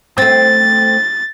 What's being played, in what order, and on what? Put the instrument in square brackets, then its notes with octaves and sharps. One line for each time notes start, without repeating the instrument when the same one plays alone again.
[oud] A3 C4 [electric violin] A6